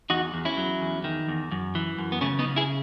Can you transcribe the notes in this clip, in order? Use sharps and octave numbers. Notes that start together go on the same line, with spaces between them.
E2 D#4 F#4
E2
C#4 E4
F#3
E2
D#3
E2
F#2
E3
F#2
B3
C#3 A3 C#4
B3 D#4
C#3
E4 G#4